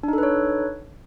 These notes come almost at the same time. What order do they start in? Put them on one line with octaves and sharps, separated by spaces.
D4 D#4 A4 B4 C#5